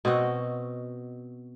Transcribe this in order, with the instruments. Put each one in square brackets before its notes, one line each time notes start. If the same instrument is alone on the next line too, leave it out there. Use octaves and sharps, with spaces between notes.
[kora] B2 C4 F#4 D#5